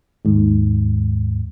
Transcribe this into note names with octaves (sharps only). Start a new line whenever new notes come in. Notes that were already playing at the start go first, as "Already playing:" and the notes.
D#2 G#2